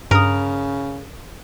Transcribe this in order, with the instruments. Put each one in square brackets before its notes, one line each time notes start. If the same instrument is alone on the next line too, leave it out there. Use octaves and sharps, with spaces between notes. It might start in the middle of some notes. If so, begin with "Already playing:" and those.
[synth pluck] G2 D#6 [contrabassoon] C#3 [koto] A#4